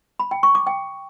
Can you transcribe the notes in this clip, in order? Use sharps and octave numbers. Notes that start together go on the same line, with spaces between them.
B5
G5
C#6
D6
G5